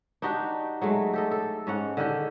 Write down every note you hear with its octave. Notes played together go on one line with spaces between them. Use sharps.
D4 D#4 F#4 G4
F#3 G#3 A3
G4 A4 D#5
A4
G#2 C#4 F#5
D3 D#3 G4